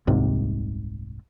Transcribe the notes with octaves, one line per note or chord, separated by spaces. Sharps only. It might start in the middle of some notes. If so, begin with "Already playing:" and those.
D#1 C2 G#2 C3